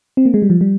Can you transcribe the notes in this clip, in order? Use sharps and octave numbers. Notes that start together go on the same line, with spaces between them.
C4
A#3
G#3
G3
F3
G3